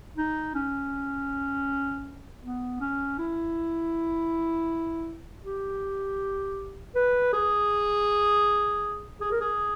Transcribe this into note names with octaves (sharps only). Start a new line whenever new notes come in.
D#4
C#4
B3
C#4
E4
G4
B4
G#4
G#4
A#4
G#4